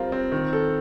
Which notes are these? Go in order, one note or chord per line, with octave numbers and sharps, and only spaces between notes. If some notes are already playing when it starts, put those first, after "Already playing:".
Already playing: G3 C4 F4 A#4
C4
D#3
A4